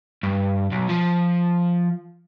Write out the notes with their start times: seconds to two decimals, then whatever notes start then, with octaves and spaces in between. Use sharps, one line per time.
0.23 G2
0.71 B1
0.89 F3